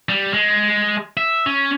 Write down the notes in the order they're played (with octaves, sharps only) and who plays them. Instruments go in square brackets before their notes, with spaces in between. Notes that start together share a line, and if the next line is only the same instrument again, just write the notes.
[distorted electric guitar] G3
G#3
E5
C#4